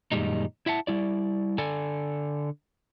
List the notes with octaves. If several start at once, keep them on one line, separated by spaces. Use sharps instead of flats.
F#2 A#2 D#3 G3 G#3 D#4
E4 E5 F#5 A5
G3 E4 D5
D3 A4 D5 G#5